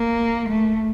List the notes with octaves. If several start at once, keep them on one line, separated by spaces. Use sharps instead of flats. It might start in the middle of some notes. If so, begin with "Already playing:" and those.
Already playing: A#3
A3